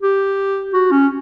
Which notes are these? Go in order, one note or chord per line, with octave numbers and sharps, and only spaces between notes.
G4
F#4
C#4